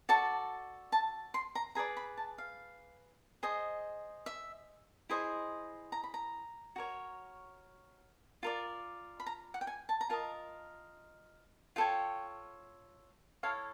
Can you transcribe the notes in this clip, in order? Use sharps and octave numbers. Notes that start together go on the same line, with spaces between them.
F#4 A4 D5 A5
A5
C6
A#5
G#4 B4 D5 A#5
B5
A5
F5
G#4 C5 D#5
E5
E4 G#4 C5 D#5
A#5
B5
A#5
F#4 A#4 C#5
F4 A#4 D5
B5
A#5
F#5
G5
G#5
A5
A#5
F4 A#4 D#5 A5
F4 A4 C#5 G5
E4 A4 C#5 F5